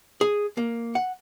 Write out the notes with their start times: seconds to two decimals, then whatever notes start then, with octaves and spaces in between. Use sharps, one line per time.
0.21 G#4
0.57 A#3
0.95 F#5